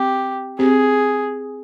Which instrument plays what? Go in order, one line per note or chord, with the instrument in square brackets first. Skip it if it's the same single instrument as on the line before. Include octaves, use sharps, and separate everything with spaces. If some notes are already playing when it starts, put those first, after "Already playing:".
Already playing: [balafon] C4 [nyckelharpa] G4
[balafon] C4 G4 C5 [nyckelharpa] G#4